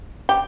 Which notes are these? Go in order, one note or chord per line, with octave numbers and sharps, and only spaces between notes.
G4